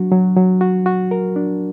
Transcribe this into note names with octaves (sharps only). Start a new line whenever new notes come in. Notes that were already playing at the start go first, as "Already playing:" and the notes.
Already playing: F#3 D4 F#4
F#3
F#3
F#4
F#4
A#4
D4